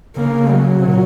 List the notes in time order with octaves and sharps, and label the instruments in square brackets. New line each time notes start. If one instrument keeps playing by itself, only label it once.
[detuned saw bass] C#3 [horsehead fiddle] A#3
[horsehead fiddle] F#3
[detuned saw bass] C3
A#2